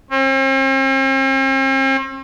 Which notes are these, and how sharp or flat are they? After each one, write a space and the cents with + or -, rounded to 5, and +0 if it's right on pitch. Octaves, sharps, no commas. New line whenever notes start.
C4 +45